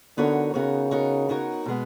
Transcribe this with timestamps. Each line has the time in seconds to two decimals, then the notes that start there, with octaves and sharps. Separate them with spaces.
0.18 D3 B3 D#4 F#4 A#4 C#5
0.54 C#3 B3 D#4 F#4 A#4 C#5
0.91 B3 D#4 F#4 A#4 C#5
1.29 B3 D#4 F#4 A#4 C#5
1.66 B2 G#3 B3